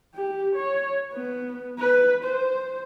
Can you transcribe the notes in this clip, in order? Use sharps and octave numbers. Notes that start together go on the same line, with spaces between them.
G4
C#5
B3
B4
C5